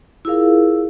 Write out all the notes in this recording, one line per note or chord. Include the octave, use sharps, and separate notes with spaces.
E4 F4 G#4 A#4 F5